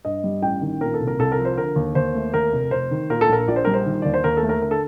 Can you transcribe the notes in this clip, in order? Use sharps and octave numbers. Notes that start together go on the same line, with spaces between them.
G2 D#5
G3
A1 G5
D#3
A#2 A#4
A4
C2
A#4
C2 A4
A#4
F3
C5
D3 A#4
D#2
D#2 C5
A3
D#2 A#4
F1
F1 C5
D#3
A#2 A#4
A4
A#1 A#4
A#1 D5
C5
G3 A#4
C5
D#3
D#2 D5
C5
D#2 A#4
A4
A3
A#4
D3 A#4
A4